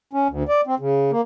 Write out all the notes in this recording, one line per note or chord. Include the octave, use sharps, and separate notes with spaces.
C#4
D2
D5
C4
C#3
A#3